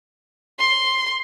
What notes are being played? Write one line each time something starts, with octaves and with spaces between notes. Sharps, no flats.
C6